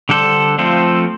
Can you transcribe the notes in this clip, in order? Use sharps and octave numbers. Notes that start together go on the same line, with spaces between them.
D3 G3 D4 A4 C5
F3 A3 C4 F4 A4